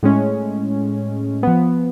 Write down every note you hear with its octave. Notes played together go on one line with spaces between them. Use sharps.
A2 G#3 C#4
F3 B3